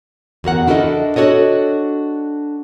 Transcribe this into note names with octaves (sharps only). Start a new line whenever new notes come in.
E2 F#4 A#4 F#5
D4 E4 F#4 A4 A#4 D#5
D4 F#4 A4 C#5 D#5